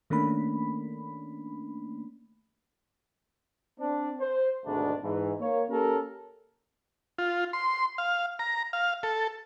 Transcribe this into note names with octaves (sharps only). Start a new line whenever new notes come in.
D#3 A3 A#3 C#4 D4 B5
C4 D4
C5
G#1 D2 B2 G#3 D4
G#2 E3
A#3 C#5
A#3 C#4 G4 A4 A#4
F4
C6
F5
A#5
F5
A4